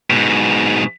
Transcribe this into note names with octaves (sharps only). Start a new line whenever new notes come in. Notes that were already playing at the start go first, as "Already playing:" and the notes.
G#2 B2